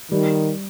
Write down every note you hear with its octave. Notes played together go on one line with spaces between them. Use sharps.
D#3 G3